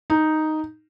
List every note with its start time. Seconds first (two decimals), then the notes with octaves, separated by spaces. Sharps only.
0.10 D#4